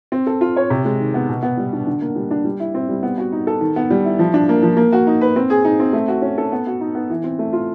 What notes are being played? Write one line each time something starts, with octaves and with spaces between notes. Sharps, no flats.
C4
A4
F4
C#5
C3
G#3
D#3
B3
B2
B3
G3
D4
D3
A#3
G3
D4
G3
E4
C4
G3
B3
F#4
D#4
A4
D#3
B3
G3
E4
F3
D4
A#3
F3
A#3
F#4
D#4
B4
C4
G#4
D#4
C4
A3
F#4
C#4
A4
B3
F#4
D#4
B3
E3
C4
A3
F4